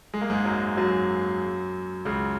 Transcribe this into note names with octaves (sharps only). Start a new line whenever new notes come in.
G#3
A#3
G#2 G#3
F#2 F#3
F#2 F#3
C#2 C#3